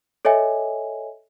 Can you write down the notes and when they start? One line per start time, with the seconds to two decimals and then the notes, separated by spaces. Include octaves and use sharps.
0.25 A4 C#5 D#5 E5 G#5